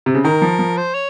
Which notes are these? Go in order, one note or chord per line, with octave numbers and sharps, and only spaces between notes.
C3
C#3
D#3 A#4
F3
F3
C5
C#5